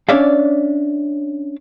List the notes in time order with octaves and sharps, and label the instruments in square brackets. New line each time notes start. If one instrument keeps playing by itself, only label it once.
[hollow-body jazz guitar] C#4 D4 C#5 D5 E5 F5